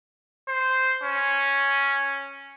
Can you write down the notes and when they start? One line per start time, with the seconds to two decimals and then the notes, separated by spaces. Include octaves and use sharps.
0.49 C5
1.04 C#4